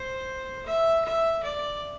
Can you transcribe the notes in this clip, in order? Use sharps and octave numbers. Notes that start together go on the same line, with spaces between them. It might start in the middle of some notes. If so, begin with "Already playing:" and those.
Already playing: C5
E5
E5
D5